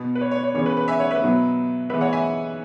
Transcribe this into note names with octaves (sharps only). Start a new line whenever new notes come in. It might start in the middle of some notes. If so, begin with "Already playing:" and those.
Already playing: B2 B3
B4
C#5
C#5
C#5
C#3 E3 B3 C#5
B4
B4
E5 G#5
C#5 F#5
B4 E5
B2 F#3 B3
E3 G#3 B3 B4 E5
C#5 F#5
E5 G#5